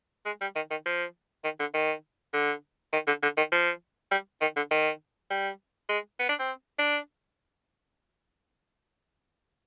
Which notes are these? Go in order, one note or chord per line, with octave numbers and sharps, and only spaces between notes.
G#3
G3
D#3
D#3
F3
D#3
D3
D#3
D3
D#3
D3
D3
D#3
F3
G3
D#3
D3
D#3
G3
G#3
B3
D4
C4
D4